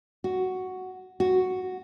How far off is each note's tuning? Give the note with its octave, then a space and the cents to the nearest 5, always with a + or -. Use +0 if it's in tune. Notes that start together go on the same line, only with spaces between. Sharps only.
F#4 +5
F#4 +0